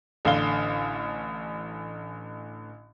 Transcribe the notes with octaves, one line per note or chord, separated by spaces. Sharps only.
A1 D3 F5 G7